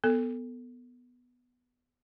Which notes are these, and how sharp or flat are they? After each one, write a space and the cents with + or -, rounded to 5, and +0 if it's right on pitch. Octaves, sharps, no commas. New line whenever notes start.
B3 +0 A4 +15